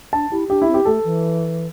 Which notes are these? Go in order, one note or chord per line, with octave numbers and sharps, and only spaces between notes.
D4 A5
E4 G4
D4 G4
E4
C4
G4
A3 A4
E3